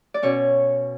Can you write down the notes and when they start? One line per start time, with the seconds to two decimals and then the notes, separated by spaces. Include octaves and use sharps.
0.14 D5
0.23 B2 C#4 C#5